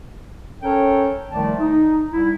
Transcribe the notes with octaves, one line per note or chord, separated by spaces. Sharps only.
C#4 A4 A#4 C#5 G5
C2 D#3 F3 A3 D5 A5
D#4
C2 E4